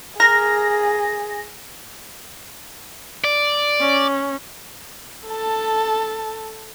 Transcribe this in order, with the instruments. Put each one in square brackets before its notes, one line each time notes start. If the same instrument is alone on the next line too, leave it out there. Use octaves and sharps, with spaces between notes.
[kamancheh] G#4 [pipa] A#4 [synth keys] A#6
[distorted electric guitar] D5
[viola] C#4
[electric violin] A4 A5